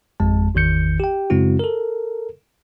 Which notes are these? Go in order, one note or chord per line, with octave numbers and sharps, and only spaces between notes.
G#1 F2 G#3 A5
G#1 E2 D#3 G6 C#7
G4 G5
F#2 C#3 G#3 C4 E4 F#4
A4 A#4